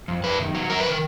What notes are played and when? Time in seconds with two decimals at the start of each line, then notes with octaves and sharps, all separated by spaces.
0.08 F2
0.23 F#2 B4
0.40 D#3
0.55 F#3
0.70 F#2 A#4
0.80 B4
0.86 D#3 A#4